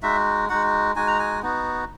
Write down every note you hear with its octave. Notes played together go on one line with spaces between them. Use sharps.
G#3 D#4 F#4 E5
G#3 D#4 F#4 F#5
G#3 D#4 F#4 G#5
A#5
G#5
B3 D#4 F#4